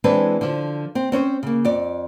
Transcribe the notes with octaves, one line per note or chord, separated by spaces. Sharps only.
E3 G#3 C4 D4 B4
D3 F3
C4
C4 C#4 B4 C5
C#3 A#3
F2 D5